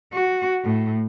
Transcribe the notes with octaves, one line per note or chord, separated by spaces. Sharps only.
F#4
A2